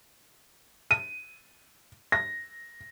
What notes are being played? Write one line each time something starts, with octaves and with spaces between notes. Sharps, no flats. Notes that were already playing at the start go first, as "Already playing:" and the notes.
D#7
A#6